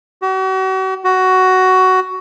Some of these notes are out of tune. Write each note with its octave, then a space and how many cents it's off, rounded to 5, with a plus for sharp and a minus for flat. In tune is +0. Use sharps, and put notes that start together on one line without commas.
F#4 +40
F#4 +10